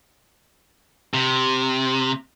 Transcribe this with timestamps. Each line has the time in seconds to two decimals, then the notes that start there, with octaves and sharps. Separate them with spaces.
1.14 C3